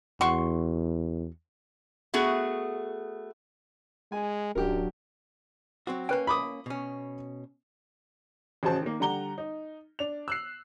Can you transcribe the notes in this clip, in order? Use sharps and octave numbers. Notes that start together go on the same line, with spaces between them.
E2 F#4 C6 C#6
A3 B3 F#4 G#4
G#3 G#5
D1 F#2 F#3 D4 G4 A#4
F#3 C4 F#4
A#3 C#4 B4 G5
B5 D6 D#6
B2 C#4
A1 C#3 F#4 G#4 C5 A5
D#3 A#3
D3 G3 F#5 A#5 G7
D#4
D4 F7
E6 F#6 C7